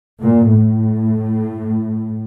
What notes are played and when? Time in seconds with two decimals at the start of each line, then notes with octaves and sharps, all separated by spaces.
0.21 A#2
0.49 A2